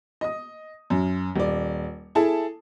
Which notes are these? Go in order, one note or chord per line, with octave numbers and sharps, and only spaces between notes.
D#5 D#6
F#2
D#1 D5
E4 G#4 A4 A5